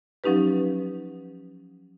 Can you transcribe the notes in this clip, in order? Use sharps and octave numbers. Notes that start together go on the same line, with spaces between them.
F3 F#3 C#4 D#4 G4 B4